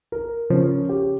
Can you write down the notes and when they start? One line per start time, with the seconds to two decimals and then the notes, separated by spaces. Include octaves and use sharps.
0.12 A#4
0.50 C#3 F3 C#4
0.89 G4